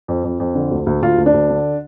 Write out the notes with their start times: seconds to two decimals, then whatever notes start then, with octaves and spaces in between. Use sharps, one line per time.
0.08 F2
0.24 F2
0.40 F2
0.55 D3
0.71 D2
0.87 D2
1.02 D2 F4
1.18 D2
1.26 D4
1.34 D2
1.50 D3